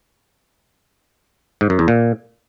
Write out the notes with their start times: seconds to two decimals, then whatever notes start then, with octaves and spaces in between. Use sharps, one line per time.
1.61 G#2
1.70 F#2
1.79 E2
1.88 A#2